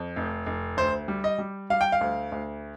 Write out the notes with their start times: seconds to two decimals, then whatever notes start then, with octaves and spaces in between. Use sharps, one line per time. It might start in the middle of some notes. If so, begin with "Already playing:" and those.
Already playing: F2
0.16 F1
0.46 F1
0.77 D2 C5
1.08 G3
1.24 D#5
1.39 G3
1.70 G3 F5
1.81 G5
1.92 F5
2.01 D2
2.32 D2